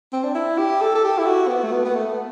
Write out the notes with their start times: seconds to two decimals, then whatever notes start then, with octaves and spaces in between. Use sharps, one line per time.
0.13 C4
0.24 D4
0.35 E4
0.58 G4
0.81 A4
0.95 A4
1.04 G4
1.18 E4
1.26 F#4
1.48 B3
1.64 A3
1.72 B3
1.85 B3
1.95 A3